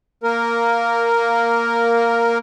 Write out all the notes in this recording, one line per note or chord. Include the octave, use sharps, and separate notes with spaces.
A#3 A#4